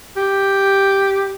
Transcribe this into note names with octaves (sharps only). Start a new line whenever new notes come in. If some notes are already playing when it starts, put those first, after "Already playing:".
G4